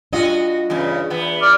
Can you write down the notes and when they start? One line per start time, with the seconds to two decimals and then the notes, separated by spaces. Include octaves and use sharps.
0.13 G3 D4 F4 F#4 D#5
0.70 E2 G2 C#3
1.10 E2 B3
1.42 D5 F6